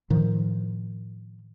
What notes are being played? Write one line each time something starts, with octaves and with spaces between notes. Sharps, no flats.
A2 D#3 F3